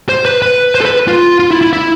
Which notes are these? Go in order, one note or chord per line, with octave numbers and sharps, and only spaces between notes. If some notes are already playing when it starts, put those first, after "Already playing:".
C5
B4
B4
C5
A4
B4
F4
F4
E4
E4
E4